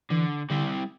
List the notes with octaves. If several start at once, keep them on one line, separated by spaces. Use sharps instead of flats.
D3 E3
D3 G3 C4 E4